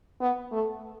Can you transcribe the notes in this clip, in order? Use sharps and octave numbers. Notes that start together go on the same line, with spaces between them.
B3
A3